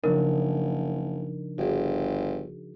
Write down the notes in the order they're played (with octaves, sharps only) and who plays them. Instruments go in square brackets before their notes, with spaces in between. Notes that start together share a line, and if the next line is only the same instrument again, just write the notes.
[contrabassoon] F#1 [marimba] C#3 [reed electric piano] F3 D4 D#4 [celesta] A#4
[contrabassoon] G1 [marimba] F#4 G#4